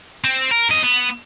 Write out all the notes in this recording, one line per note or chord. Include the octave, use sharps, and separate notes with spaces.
C4
A#4
F2 D#5
B3